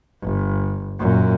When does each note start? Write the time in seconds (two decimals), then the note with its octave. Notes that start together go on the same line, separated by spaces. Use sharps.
0.22 G1
1.00 F#2 A#2